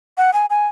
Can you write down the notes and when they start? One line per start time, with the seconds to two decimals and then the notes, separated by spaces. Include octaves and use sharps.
0.18 F#5
0.33 G#5
0.50 G#5